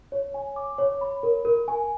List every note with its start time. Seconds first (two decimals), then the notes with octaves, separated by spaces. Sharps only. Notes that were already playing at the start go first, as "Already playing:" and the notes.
0.12 C#5
0.34 G#5
0.56 D6
0.78 C#5
1.01 B5
1.23 A#4
1.45 A#4
1.68 G#5